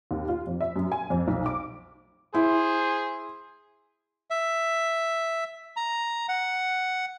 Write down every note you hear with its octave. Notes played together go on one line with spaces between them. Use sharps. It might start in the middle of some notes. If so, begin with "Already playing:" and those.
D#2
F4
F2
E5
F#2
G#5
F2
B1
D6
E4 G#4 C5
E5
A#5
F#5